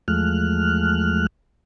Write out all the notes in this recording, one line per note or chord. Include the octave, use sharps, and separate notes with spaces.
E2 F3 G#3 A3 F6 F#6